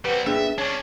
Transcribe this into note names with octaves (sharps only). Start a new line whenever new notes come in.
G3 C4 B4 F#5
A#3 B3 D4 G#4 E5 G5
C#4 D4 C#5 G#5